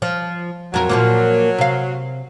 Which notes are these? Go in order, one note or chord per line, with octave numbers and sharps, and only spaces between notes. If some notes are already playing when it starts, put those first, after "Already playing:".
F3
F2 F#3 A#4
A#2 F3 A#3
C3 F5